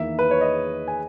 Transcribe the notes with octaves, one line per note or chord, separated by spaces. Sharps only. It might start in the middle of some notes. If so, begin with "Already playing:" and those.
Already playing: E2 D#3 A#3 E4 E5
B4
C#5
D#5
G#5